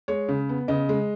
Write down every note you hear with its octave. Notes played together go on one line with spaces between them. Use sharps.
G#3 C#5
C#3
B3
C#3 D#5
G#3